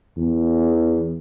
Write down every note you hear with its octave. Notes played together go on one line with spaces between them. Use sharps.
E2